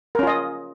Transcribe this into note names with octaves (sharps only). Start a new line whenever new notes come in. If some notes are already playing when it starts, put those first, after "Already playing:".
C#4 F4 A#4 D#5